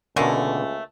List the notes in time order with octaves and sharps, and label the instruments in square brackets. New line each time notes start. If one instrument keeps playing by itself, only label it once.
[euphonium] C#2 [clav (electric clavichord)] B2 D3 [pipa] A3 A#3 C#4